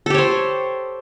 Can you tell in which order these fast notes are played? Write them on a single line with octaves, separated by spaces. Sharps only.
A4 G4 C#5 C5